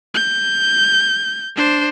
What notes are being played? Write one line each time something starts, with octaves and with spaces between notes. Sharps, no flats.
G6
D4 C5